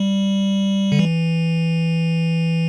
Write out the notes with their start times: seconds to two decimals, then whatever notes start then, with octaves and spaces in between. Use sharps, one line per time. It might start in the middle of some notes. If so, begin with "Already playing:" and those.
Already playing: G3
0.92 D3
0.99 E3